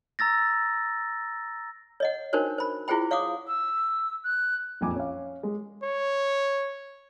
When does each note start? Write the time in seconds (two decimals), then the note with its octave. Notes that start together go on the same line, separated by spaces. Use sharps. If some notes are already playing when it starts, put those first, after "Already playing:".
0.19 A#5 E6 A6 A#6
2.00 C#5 D#5 F#5
2.33 D4 D#4 F#4 A#4 C5 C#5
2.58 C5 B5
2.88 E4 F4 G#4 C5 G5 B5
3.11 C#5 F5 F#5 D6 D#6
3.47 E6
4.23 F#6
4.81 A#1 F2 G#5 D6
4.95 C#4 F5
5.43 G#3
5.83 C#5